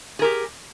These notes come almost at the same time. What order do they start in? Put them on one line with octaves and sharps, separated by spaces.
G#4 A#4 G4